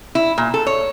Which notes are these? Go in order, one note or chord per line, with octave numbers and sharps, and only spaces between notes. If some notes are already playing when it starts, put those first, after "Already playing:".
E4
A#2
A4
C#5